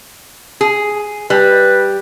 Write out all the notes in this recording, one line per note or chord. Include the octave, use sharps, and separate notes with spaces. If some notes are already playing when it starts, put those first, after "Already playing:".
G#4
G3 B4